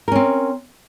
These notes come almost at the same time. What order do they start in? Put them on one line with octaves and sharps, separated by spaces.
A#4 C#4 C4